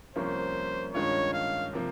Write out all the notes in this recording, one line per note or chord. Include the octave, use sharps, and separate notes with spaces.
C2 C3 F3 A#3 C#4 C5
G2 D#3 G#3 C#4 F4 C#5
F5
C3 F3 A#3